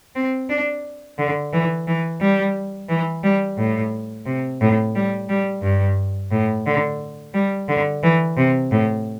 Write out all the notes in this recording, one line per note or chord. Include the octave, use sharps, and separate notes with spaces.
C4
D4
D3
E3
E3
G3
E3
G3
A2
C3
A2
G3
G3
G2
A2
D3
G3
D3
E3
C3
A2